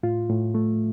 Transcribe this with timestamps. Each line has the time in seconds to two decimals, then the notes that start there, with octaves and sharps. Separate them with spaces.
0.03 A2 F4
0.29 A2
0.55 A3